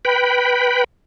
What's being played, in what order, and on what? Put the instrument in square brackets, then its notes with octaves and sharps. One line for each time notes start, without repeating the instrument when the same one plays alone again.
[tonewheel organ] B4 G5 B5